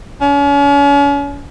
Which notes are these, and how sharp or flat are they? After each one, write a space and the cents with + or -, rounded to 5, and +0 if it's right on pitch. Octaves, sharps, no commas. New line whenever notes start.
C#4 +40